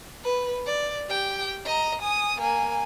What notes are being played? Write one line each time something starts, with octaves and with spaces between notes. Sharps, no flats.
B4
D5
G4 G5
D#5 A#5
G#5 D#6
A#3 G#5